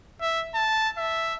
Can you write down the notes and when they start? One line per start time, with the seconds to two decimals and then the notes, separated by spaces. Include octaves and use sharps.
0.21 E5
0.55 A5
0.98 E5